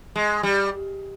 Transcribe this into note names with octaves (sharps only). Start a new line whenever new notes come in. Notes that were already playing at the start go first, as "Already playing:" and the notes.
G#3
G3